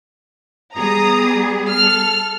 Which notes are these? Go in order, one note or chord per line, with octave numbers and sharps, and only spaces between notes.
G3 B3 G#4 A#5 D#6
A4 F6